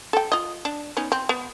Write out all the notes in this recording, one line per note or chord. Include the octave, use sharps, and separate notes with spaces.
A4 G5
F4 D#5
D4
B3 C#4 D#4
C4
B3